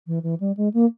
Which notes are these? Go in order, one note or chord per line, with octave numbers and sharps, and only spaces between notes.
E3
E3
G3
G#3
A#3